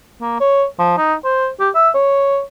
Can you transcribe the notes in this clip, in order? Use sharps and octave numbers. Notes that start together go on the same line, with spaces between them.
A#3
C#5
F3
D#4
C5
G4
E5
C#5